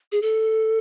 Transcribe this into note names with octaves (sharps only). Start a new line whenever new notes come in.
G#4
A4